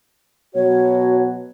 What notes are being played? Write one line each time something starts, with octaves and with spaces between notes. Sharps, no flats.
B2 F#3 F#4 C#5